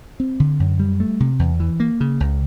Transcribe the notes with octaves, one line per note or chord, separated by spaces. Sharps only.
C4
D3
F#2
G3
A3
C3
E2
E3
A#3
C#3
C#2